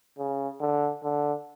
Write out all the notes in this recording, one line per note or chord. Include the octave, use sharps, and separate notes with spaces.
C#3
D3
D3